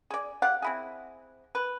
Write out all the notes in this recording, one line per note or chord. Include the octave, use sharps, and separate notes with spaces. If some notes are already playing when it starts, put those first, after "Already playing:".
G#4 D5
G4 D5 F5 F#5
C4 E4 G#4
B4